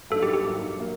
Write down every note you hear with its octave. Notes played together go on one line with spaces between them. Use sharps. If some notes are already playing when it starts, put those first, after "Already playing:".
G2 F#3 A#3 D#4 A4
G4
G4
G2 F#3 A#3 D#4
F#3 A#3